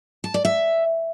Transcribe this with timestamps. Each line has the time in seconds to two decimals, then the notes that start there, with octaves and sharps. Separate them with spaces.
0.24 A5
0.34 D5
0.45 E5